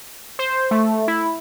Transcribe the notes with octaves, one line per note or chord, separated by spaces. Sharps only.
C5
A3
E4